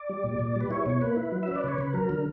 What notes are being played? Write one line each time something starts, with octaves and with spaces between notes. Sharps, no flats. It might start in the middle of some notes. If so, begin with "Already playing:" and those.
Already playing: D5
G3
A#2
A#2
G3 B4
E4 C#5
B2 C#5
A#3 B4
E4
F#3
E5
C#4
D5
C#3 C#5
C#3 B4
F#3 A#4
D3